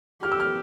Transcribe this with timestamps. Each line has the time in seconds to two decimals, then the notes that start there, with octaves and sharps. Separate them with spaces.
0.23 G4 F6
0.32 E6
0.40 F6